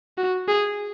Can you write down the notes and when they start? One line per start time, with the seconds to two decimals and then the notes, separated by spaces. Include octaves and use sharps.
0.18 F#4
0.48 G#4